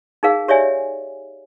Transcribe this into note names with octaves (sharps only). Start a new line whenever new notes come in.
D#4 G#4 A#4 F5
G4 C#5 D5 E5 G#5